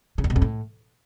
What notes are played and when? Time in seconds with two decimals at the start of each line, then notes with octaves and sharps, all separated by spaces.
0.18 C#3
0.24 E2
0.30 B2
0.36 F2
0.42 A2